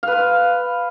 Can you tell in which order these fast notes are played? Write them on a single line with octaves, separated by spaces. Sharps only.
F5 B4 C6